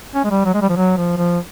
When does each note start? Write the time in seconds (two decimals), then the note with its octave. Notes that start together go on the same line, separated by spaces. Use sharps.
0.15 C#4
0.24 G#3
0.30 G3
0.45 F#3
0.54 G#3
0.62 G3
0.69 F3
0.76 F#3
0.97 F3
1.17 F3